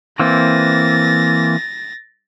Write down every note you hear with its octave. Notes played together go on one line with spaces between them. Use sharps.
E3 A#3 C4 A6 A#6